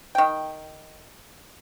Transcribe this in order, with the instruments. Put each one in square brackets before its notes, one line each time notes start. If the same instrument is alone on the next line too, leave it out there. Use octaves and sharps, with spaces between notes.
[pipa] D#3 G5